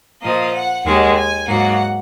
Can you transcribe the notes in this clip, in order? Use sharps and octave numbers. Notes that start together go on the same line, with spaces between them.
A#2 F3 A#3 D#5
F#5
D#2 D#3 G#3 F#5
G#5
G#2 F#3 A#3 F#5